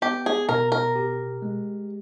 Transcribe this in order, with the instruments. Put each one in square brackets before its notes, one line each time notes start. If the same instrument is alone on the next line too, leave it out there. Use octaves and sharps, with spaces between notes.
[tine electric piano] B3 [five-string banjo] G4
[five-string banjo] G#4
[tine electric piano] B2 [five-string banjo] A#4
[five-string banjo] A#4
[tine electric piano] G4
G#3